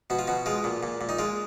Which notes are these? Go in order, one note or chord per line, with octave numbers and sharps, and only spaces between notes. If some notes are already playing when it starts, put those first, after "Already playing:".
B2 F#4
F4
B2 F#4
G#3 F4
A#2
A#2
A#2
D#4
G#3 F4